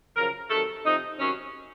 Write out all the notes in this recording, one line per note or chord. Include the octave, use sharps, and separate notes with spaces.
F#2 C#3 F3 A#4
C3 D#3 F#3 A4
C3 F3 D#4
C3 D#3 F#3 C#4